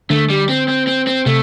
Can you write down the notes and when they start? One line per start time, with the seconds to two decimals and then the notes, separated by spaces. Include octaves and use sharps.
0.10 D3 A3 D4
0.30 G3
0.49 C4
0.68 C4
0.87 C4
1.07 C4
1.26 C3 A3 C4